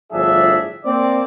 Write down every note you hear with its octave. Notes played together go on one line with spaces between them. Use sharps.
G1 A2 F3 D4 G#4 E5
A#3 C4 D5